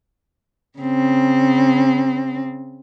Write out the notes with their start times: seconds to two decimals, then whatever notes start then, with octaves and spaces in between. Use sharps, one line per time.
0.79 C#3 C4